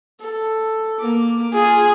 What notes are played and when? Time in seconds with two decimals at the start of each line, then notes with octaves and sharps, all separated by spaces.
0.20 A4
1.00 A#3 D6
1.54 F4 G#4